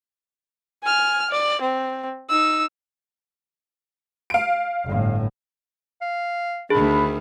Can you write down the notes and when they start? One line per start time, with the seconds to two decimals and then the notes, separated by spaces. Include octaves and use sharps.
0.83 G#5 F6
1.31 D5
1.61 C4
2.30 D#4 E6
4.30 F5 D7
4.85 G1 A2
6.01 F5
6.70 D2 D#3 D4 G#4 B5